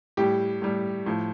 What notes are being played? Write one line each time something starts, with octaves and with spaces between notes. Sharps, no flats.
A2 G3 G4
A2 G3
A2 F3